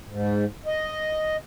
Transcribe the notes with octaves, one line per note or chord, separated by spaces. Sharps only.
G#2
D#5